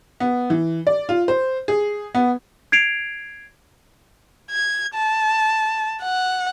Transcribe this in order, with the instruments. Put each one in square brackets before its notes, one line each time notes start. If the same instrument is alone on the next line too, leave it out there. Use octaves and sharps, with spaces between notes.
[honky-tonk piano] B3
E3
D5
F4
C5
G#4
B3
[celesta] G#6 C7 D7 F7
[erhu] G#6
A5
F#5